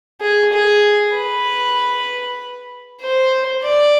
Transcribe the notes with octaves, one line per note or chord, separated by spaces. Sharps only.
G#4
G#4
B4
C5
D5